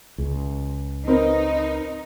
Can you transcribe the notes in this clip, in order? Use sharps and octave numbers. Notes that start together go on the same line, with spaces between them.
C#2
C4 D#4 A#4 B4